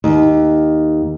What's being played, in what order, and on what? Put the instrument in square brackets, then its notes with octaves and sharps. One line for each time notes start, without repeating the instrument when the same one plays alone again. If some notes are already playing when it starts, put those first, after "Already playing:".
[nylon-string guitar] D#2